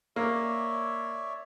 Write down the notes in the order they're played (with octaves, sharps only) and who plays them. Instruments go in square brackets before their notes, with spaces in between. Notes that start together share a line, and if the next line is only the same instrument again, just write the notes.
[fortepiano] A#3 [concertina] C#5 D5 E5